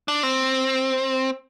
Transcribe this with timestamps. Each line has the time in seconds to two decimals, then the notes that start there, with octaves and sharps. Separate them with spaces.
0.08 D4
0.23 C4